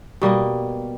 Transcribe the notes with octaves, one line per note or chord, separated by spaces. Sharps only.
B2 G3 A#3 D#5